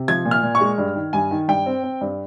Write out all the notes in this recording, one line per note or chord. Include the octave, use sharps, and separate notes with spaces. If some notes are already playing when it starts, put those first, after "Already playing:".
Already playing: C3
F3 G#6
A#2
F6
A#2
C#6
G#3
G2
D#3
G2 G#5
D#3
G2 G5
C4
C4
G2